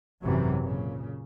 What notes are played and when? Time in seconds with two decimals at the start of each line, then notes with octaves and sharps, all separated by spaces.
0.21 G#1 F#2 C3 E3 F#3
0.61 A#2 C#3